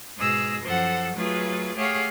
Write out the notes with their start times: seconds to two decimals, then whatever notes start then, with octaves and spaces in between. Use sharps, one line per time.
0.17 G#2 B2 G#4 E6 A#6
0.63 F#2 F3 A4 C5 F#5
1.15 F#3 A3 F4 G#4 B4
1.76 A3 G4 G#4 C#5 F5 F#5